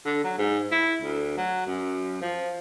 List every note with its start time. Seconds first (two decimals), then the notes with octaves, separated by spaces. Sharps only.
0.05 D3
0.24 F#3
0.38 G#2
0.72 E4
1.02 D2
1.37 F#3
1.67 F#2
2.22 F3